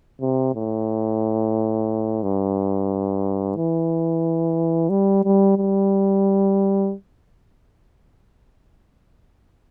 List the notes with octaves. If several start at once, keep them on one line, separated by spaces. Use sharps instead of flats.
C3
A2
G2
E3
G3
G3
G3